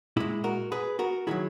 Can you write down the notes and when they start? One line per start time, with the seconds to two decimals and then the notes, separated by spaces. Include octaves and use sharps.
0.17 A#2 G#3 E4 G#4
0.44 F#4 A#4
0.72 G#4 B4
0.99 F#4 A#4
1.27 D#3 F#3 E4 G#4